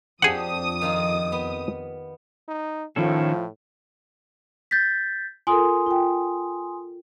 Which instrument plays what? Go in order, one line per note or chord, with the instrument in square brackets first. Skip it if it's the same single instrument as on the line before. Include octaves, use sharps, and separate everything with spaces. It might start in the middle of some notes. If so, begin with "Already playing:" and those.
[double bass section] F2 [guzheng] F3 D4 G4 [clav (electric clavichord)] G#4 F#5 [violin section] D#6
[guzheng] D#3 F4 A#4
B3
[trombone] D#4
[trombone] A2 [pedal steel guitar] D#3 C#4 A4 [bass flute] F3
[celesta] G6 A6 B6
[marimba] F4 A4 A#4 [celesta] G#5 C6 D#6
[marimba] F4 G5